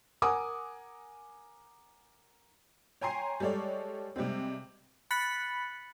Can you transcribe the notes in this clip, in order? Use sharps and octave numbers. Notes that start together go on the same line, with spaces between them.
A#4 F#5 G#5 D6 D#6
C#5 G5 G#5 A#5 C6 C7
G3 G#3 A4 C#5 D5
C3 G3 G#3 C4
B5 F#6 A6 B6 C#7 F#7